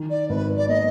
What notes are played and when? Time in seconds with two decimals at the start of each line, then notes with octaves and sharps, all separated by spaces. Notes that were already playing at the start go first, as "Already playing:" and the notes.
Already playing: D#3
0.10 D5
0.29 G#1 B4
0.57 D5
0.68 A#3 D#5